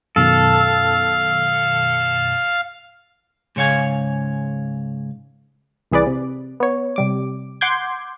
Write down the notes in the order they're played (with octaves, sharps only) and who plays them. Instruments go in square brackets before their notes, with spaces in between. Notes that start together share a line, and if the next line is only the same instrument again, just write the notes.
[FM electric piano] F#2 B2 D#3 [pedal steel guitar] A4 [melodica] F5
[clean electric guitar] G#2 C#3 C#5 F5 G#5
[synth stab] C2 E3 G#4 B4 D5
C3
B3 C#5
C3 G3 D6
F#5 C6 D6 G6 G#6